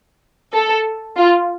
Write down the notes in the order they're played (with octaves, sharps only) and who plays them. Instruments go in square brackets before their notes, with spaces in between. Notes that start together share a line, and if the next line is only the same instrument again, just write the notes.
[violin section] A4
F4